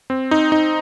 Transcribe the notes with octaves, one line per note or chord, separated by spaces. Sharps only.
C4
D#4
D#4